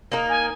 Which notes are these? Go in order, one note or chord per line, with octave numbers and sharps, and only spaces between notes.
A#3 D#4 A#4
G#5